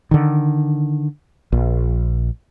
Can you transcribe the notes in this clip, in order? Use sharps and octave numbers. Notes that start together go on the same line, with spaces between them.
D3 D#3
A#1